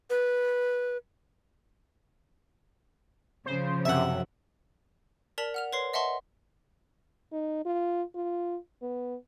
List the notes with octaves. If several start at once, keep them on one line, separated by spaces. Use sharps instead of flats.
B4
C#3 F3 C5
F#2 C3 E5 F#5
A#4 D5 A5 B6 F7 F#7
F#5 F6 F7
B4 C#5 C6 C7
D#5 E5 F#5 A5 C6 C#6
D#4
F4
F4
B3